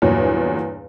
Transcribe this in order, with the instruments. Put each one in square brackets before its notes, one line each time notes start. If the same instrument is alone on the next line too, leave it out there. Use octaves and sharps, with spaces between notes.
[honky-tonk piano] G1 E2 A#2 F#3 C#5